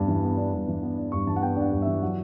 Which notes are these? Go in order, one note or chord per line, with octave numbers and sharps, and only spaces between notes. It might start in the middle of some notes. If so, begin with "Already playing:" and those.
Already playing: G2 B3 D4
E3
B3
D4
G2
E3
B3
D4
G2 C#6
E3 A5
F#5
B3 G5
D4
F#5
G2
E3 E5
F#3 F#5